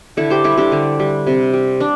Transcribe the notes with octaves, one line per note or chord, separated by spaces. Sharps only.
D3 E4 A4
G4 C5
G3 E4 A4
D4 G4
D3
G3
C3
G3
D4